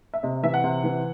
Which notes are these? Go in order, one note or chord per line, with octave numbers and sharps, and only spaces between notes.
E5
C3 D#5
E3 E5
F#5
C3
E3